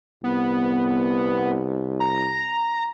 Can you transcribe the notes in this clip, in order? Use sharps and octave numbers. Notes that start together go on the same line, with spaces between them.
C2 B3
A#5